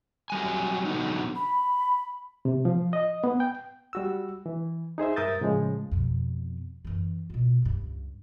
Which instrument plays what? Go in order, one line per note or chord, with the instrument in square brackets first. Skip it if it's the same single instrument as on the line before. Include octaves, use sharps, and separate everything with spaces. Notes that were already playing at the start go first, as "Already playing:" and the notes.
[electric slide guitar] F#3 G3 G#5
D3 F#3 B3 D#4
[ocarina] B5
[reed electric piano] C3
F3
D#5
B3
G5
G3 F#4 E6
E3
D#4 G#4 C5 E5
G2 A#4 E5 D#6 G6 A6
A2 C#3 F3 G#3
[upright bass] F2 B2
F#2 E3
B2 F4
C#2 G2